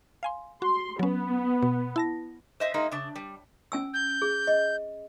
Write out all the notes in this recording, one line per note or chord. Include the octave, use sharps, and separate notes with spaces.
F5 G#5 C6
F#4 C6
F#3 B3 C#4
B2
E4 A5 A#6
C5 D#5 E5
G#3 A#3 D#4 G#4
C#3 D4
G3
C#4 G#5 E6
G6
G#4
D#5